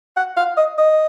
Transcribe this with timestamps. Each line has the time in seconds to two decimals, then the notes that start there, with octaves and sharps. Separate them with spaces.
0.17 F#5
0.37 F5
0.57 D#5
0.78 D#5